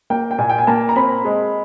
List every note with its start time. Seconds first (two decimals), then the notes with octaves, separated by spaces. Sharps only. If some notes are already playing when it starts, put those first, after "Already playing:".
0.10 A#3 G5
0.31 G5
0.39 A#2 G#5
0.50 G5
0.58 G#5
0.67 A#3 A5
0.89 A#5
0.96 C4 B5
1.25 G#3